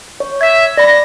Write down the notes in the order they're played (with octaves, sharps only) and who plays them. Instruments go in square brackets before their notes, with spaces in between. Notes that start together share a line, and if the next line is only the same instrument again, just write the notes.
[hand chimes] C#5
[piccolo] E5 [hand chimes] G#6 B6
[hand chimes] D5 B5 [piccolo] A#6